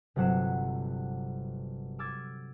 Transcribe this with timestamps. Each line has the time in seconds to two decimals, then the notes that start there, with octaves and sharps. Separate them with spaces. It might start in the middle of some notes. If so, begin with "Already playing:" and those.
0.16 G1 C3 F#3 F#5 C7 E7
1.99 D6 E6 F6 G#6 A6